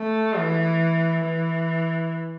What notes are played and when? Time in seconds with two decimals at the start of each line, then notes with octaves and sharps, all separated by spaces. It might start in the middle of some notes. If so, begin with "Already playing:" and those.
Already playing: A3
0.37 E3
1.26 E3